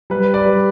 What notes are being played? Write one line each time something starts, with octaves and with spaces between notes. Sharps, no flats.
G3 B4
B4 D5
G3